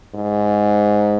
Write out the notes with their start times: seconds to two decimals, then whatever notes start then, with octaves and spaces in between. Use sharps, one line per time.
0.15 G#2